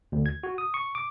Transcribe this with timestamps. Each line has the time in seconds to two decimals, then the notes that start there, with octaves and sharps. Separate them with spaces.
0.12 D2
0.26 G#6
0.43 F#4
0.58 D#6
0.74 C#6
0.95 D6